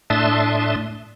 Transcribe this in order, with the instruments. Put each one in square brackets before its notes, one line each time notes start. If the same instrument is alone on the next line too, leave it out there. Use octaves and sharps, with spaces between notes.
[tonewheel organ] A2 D4 E5 A5 C6 D#6